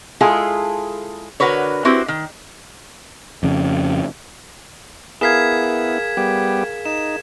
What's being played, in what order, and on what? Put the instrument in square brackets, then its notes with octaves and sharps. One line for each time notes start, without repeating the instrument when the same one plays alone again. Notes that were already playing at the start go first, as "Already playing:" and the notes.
[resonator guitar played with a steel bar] G#3 E4 F4 G#4 A4
D3 F#4 A#4 B4 C#5
C4 E4 F#4 G4 B4 C5
D#3
[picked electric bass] F2 C#3
[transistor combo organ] B3 E4 [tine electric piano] G#4 A#4 F5 [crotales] G#6 B6 E7
[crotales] B6
[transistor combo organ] G3 B3 G4
[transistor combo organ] D#4 [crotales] E7